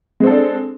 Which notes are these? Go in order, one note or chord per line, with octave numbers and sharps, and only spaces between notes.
G#3 C4 D4 A4